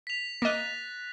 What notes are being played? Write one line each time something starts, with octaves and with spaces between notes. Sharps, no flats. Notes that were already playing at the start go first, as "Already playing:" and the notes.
B6 F7
A#3 D#5 F#6 A6 A#6